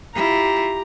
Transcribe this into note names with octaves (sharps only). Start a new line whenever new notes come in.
E4 F4 G4 A#5